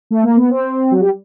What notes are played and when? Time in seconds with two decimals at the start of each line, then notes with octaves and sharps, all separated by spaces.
0.11 A3
0.23 A#3
0.37 B3
0.50 C4
0.91 F#3
1.00 G3